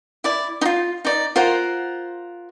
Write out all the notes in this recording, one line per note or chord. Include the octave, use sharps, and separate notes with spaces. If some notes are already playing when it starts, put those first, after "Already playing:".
E4 D5 D6
D#4 F4
D#4 D5
F4 A#4 C5 F#5